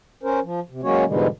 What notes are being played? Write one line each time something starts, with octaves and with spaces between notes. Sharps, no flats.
C#4 A#4 C5
F3
C3
F#3 G#3 A#3 C#4 F#4 C#5
G#2 B2 D3 E3 G3 G#3